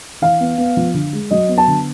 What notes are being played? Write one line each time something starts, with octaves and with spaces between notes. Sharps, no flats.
E3 F5
B3
B3
F3
D3
G#3
F#3 D#5
B3
A5
D3